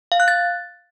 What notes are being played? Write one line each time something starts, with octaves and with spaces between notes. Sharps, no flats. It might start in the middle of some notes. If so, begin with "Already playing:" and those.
F5
F#6
A6